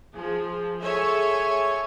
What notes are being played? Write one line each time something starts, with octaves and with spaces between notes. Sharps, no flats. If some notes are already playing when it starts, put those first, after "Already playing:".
F3 G#4
G#4 A4 C#5 E5 G#5